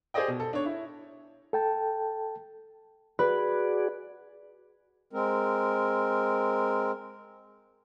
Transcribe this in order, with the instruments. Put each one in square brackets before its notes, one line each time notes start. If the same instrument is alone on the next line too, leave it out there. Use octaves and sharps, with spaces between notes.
[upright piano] G4 G#4 C5 D5 D#5 G5
B2
A4
D4 C#5
E4
[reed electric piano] A4 G5 A5
[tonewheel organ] F#4 G#4 D5 [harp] B4
[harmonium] G#3 C4 A#4